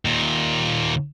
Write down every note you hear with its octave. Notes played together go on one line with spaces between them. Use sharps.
D#2 A#2